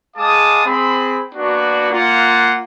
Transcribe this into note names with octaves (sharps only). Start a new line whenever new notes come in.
G#3 G#4 F5 A5 D6 D#6
C4 G#4 B5
A#3 B3 D4 F#4
A#3 F4 F#5